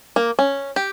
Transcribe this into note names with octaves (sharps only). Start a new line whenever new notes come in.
A#3
C#4
G4